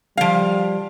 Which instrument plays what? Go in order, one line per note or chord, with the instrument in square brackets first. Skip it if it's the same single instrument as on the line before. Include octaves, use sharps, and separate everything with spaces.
[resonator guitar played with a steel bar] F3 F5 [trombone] G3